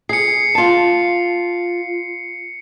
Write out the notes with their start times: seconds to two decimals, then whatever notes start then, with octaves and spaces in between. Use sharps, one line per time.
0.09 G#4 C7 C#7
0.55 F4 A5